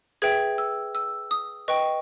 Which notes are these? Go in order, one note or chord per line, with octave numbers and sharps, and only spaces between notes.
G#4 B4 E5 G5 G#6
E6
E6
D#6
B4 D#5 G5 C#6